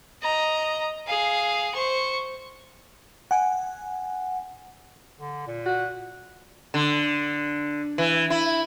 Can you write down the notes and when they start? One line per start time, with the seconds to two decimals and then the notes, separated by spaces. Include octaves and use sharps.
0.22 D#5 A#5
1.07 G#4 F5
1.75 C5 C#6
3.31 F#5 G#5
5.20 D3
5.47 A#2
5.66 F#4
6.74 D3
7.98 E3
8.30 E4